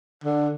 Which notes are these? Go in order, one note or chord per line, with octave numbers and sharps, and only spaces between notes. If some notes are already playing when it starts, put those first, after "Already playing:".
D3